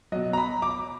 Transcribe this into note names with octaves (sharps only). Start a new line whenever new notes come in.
B2 F#3 D#5
A#5
B5
D6